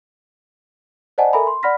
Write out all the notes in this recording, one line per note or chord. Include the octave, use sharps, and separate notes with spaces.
C5 D5 D#5 F#5 G#5 A5
A4 A#4 E5 G#5 A#5 B5
C6
D5 F#5 B5 F6 A#6 B6